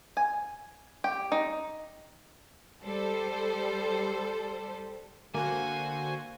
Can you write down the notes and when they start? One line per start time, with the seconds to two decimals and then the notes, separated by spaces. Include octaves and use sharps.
0.17 G#5
1.04 G4
1.32 D#4
2.82 G3 A4 C5
5.34 D3 A#3 F#4 C5 G#5